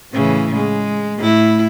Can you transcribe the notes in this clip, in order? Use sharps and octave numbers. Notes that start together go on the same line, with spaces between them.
A2 C#3 E3
G#3
A2 E4